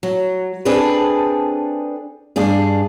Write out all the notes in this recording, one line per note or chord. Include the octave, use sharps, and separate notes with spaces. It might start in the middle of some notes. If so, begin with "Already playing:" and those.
F#3
C4 D4 G#4 A4 B4
G2 D4 G#4